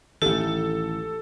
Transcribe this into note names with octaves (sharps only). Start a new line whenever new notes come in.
A1 D#3 G4 A4